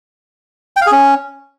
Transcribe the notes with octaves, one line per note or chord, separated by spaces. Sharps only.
G5
F5
G#4
C#4